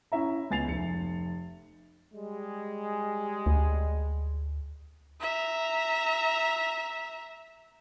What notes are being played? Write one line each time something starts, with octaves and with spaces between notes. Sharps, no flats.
C#4 E4 E5 A#5
C#2 B3 G#5 A6 C7 F7
F1 C#7
G3 G#3
D2
E5 A#5